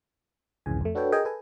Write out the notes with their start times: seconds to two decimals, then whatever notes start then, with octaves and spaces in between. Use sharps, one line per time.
0.66 C2 F2 G#2 C#3 E3 G#5
0.81 F2 A3
0.95 D4 F#4 A4 B4 C#5 G5
1.12 G#4 A#4 D#5 G5 G#5 A#5
1.25 A4 B4 G#5